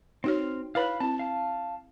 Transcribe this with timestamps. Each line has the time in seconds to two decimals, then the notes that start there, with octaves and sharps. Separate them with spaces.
0.24 C4 D#4 F#4 C#5 F6
0.75 E4 B4 C#5 F5 B5 F#6
1.00 C4 E4 A5
1.19 F5 A5